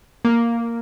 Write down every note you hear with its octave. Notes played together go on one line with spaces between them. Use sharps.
A#3